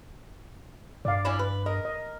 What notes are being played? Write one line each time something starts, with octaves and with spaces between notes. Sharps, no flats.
G2 D5 F5
C#4 D4 E4
B4
A#4 D#5
D#5